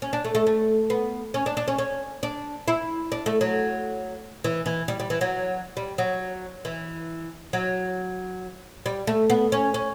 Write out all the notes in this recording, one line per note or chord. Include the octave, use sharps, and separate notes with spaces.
C#4
D4
A3
A3
A3
B3
C#4
D4
D4
C#4
C#4
D4
E4
D4
A3
F#3
E3
E3
G3
G3
E3
F#3
G3
F#3
E3
F#3
G3
A3
B3
C#4
C#4